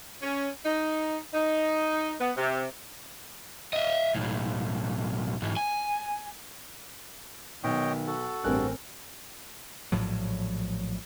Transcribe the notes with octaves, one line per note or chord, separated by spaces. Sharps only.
C#4
D#4
D#4
B3
C3
D#5 E5
B1 A2
G#2 E3
G#5
B1 D#3 C#5 D#5 G5
F#4 A4
A1 G2 C4 A#4 G#5 F#6
A#1 A2 F3 F#3